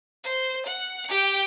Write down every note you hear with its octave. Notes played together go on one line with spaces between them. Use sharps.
C5
F#5
G4 G5